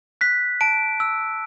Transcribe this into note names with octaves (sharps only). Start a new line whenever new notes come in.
F#6 B6
A5 D7
E6